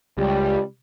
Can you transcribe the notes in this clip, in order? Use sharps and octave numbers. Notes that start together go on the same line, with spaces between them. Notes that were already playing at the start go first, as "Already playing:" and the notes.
C#2 G3